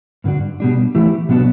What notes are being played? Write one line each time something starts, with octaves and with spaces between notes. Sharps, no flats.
G2 D3 A3 D4 F#4
B2 G3 D4
E3 A3 E4 G4
B2 F#3 B3 D4 F#4